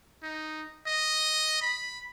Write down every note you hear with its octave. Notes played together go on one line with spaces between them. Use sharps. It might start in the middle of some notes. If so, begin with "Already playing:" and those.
D#4
D#5
B5